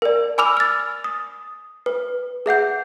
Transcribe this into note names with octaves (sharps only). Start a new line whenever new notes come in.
A#4 D5
G#5 B5 D6 E6 F6 F7
F6 A6
D#6
B4
G#4 E5 F#5 G6